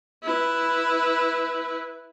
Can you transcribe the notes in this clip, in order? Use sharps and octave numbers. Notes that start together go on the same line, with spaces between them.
E4 B4